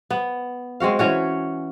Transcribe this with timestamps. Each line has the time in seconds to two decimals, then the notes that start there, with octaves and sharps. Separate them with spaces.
0.10 B3
0.80 G#3 C4 F#4 F5
0.99 E3 C#4 F#4